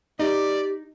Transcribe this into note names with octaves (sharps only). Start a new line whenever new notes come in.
D#4 G4 D5